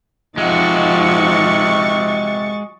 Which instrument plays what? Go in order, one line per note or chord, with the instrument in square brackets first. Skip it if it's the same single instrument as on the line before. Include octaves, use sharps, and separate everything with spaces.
[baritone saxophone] C3 [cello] F3 D#4 [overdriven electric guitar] G#3 F#4 [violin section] C#6 A6